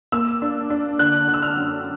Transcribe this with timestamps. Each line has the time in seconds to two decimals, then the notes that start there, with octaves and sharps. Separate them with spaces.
0.12 A#3 E6
0.42 D4
0.70 D4
0.99 D3 F#6
1.28 D3
1.34 E6
1.42 F6
1.57 F#2